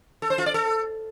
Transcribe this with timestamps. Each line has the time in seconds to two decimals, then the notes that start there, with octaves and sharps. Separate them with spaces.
0.22 A4
0.30 C5
0.38 F4
0.46 D5
0.54 A4